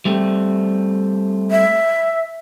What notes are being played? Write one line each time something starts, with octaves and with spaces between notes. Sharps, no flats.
G3 A3 C4
E5